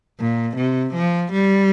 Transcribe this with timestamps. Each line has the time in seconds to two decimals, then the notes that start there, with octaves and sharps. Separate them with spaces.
0.20 A#2
0.57 C3
0.94 F3
1.32 G3